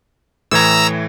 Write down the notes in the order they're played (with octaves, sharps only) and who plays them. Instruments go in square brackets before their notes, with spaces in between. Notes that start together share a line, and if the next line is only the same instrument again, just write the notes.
[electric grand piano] A2 E3 G#6 [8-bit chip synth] A#5 E6